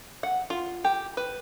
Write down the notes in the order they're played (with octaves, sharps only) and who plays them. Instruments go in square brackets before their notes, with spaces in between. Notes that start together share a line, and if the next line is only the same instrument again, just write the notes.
[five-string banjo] F#5
F4
G4
B4